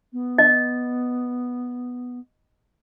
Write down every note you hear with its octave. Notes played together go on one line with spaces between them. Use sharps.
B3
D#5